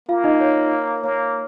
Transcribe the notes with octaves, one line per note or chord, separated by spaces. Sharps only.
A#3 F4 F5
D#4 D#5
C#5
A#3 C#5